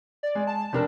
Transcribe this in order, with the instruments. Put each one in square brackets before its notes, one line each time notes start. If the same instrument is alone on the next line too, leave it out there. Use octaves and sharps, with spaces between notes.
[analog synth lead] D5
[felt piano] G#3
[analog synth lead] A5
[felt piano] F1 D4 A#4